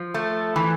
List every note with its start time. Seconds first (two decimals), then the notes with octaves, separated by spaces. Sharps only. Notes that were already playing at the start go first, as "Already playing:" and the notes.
Already playing: F3
0.14 A3
0.56 E3